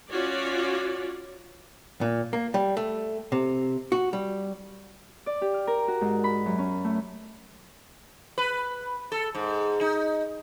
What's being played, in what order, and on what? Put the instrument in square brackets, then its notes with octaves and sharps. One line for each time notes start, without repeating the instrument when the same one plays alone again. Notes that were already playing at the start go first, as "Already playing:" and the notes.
[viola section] C#4 F4 F#4 C#5 D5
[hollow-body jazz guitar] A#2
A#3
G3
A3
C3
F#4
G3
[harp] D5
G4
F6
A#4
F#4
G#2
B5
F#2
C#4
A3
[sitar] B4
A4
G#2
D#4